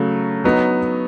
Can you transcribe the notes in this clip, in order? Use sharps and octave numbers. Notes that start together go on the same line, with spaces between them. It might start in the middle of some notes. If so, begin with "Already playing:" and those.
Already playing: C#3 F#3 A3
F#3 B3 D#4